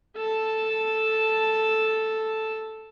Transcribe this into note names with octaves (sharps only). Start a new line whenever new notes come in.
A4 A5